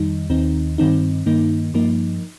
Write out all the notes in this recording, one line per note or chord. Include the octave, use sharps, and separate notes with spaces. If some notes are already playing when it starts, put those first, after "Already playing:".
Already playing: F2 D#3 G3 D#4
D#2 D#3 C4 D#4
G2 D#3 C4 D#4
G2 D#3 A#3 D#4
G2 F3 A#3 D#4